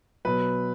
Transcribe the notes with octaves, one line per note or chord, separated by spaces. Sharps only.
B2 F#3 B4